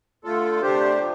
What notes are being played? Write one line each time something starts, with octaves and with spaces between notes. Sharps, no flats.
D3 A3 F4 A4
C3 A3 D4 G4 C5
F3